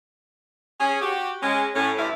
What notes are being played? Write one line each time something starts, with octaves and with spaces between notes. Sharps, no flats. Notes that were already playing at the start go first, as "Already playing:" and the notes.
C#4 G#4
F#4 G4
G#3 C#4
A2 C#4
D2 G2 E3 E4 E5 F5